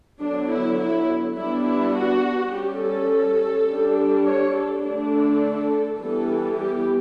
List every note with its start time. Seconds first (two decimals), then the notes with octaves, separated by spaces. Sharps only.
0.21 D3 F#3 B3 D4
0.51 E4
0.80 E4
1.36 G3 B3 D4 E4
1.65 E4
1.95 F#4
2.52 G3 C#4 G4
2.81 A4
3.68 G3 D4
4.26 C#5
4.55 A4
4.83 D3 A3 D4
5.13 A4
5.99 E3 G3 B3 A4
6.57 G4